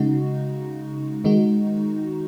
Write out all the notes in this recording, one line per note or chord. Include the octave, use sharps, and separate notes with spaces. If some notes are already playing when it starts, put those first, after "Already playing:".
Already playing: C#3 G#3 D#4 F#4
D#3 G#3 D#4 F#4